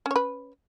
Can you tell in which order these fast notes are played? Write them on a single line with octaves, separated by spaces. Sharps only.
C#4 C#5 B4